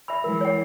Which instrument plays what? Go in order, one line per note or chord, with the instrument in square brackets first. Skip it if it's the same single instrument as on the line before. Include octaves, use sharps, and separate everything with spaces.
[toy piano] E5 B5
[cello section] E3 G#3 [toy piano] A#4
[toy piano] C#5 F#5